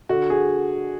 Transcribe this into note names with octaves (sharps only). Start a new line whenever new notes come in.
D3 F#4
G#4